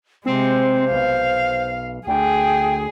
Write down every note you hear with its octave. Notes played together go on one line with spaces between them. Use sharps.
C3 G#3 C4 C5
B1 F5
D2 G#4 G5